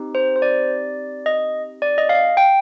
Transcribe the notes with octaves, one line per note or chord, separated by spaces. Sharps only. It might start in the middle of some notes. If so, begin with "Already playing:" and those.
Already playing: C4 D#4 G4
C5
C5
D5
D#5
D5
D#5
F5
G5